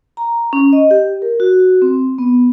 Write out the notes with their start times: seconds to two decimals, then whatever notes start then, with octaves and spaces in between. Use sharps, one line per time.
0.17 A#5
0.53 C#4
0.73 D#5
0.91 G4
1.22 A#4
1.40 F#4
1.82 C4
2.18 B3